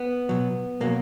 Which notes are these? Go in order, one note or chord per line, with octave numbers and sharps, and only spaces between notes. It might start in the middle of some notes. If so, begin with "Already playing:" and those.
Already playing: B3
B2 F#3
B2 F#3 A#3